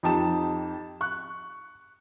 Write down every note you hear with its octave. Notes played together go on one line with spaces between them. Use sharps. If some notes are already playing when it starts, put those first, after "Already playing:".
F2 D#4 G4 A5 E7
C#6 F#6